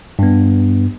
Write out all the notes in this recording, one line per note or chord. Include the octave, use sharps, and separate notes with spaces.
G2 B3